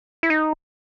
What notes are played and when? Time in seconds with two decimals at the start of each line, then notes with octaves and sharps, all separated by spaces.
0.23 E4
0.30 D#4